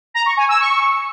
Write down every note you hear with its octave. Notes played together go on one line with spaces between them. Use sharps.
A#5
C#6
G#5
E6
C#6